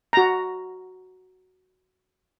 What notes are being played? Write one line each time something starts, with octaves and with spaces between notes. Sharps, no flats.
F#4 A#5